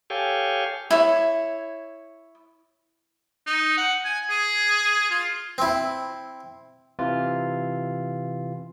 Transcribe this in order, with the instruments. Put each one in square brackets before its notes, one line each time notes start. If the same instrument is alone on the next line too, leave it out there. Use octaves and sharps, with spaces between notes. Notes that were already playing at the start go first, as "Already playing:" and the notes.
[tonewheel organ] G4 A4 C#5 F5 G5 G#5
[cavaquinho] E4 C#5
[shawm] D#4
F#5
G#5
G#4
F4
[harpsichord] C4 E4
[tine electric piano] C3 E3 F4